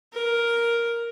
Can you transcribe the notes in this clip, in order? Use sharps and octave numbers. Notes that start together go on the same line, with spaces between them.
A#4